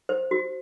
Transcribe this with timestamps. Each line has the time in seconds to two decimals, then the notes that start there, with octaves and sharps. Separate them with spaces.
0.09 C5
0.31 F#4